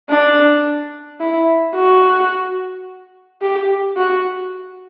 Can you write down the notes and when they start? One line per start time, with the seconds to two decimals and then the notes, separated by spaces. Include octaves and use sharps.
0.10 D4
1.21 E4
1.76 F#4
3.42 G4
3.97 F#4